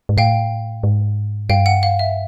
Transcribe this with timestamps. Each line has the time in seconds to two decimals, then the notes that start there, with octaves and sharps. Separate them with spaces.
0.09 G#2
0.17 A2 F5 G5
0.83 G#2
1.49 G2 F5 G5
1.66 F#5
1.83 F5
1.99 E5